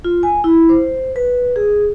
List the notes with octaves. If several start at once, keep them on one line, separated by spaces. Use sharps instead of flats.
F4
G#5
E4
C5
B4
G#4